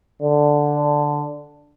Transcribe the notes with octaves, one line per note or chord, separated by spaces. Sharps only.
D3